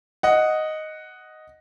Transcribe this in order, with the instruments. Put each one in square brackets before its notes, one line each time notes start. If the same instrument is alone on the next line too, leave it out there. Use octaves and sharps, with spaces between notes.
[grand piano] D#5 F#5